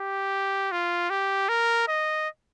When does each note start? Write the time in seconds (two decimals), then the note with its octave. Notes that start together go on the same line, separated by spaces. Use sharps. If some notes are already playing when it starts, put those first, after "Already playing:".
Already playing: G4
0.71 F4
1.10 G4
1.49 A#4
1.88 D#5